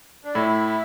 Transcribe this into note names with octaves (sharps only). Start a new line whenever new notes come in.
D4
A2 E4